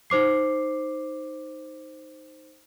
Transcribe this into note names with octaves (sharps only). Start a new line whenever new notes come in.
D#4 C5 D6 C7